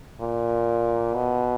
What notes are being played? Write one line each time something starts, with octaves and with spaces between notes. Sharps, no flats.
A#2
B2